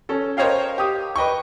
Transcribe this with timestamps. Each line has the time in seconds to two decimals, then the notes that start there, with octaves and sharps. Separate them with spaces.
0.09 C#4 A4
0.37 A#4 C5 C#5 D#5 F5 G5
0.78 G4 D#6
1.16 B4 D#5 G5 C#6